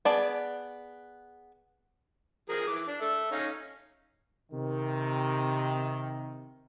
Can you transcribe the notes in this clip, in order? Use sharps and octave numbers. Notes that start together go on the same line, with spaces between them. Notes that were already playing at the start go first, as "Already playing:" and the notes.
B3 G#4 D5 A5
F3 G#4 A#4
E3 D6
D4
A4 E5
C#4 D#4 F5
C3 D#3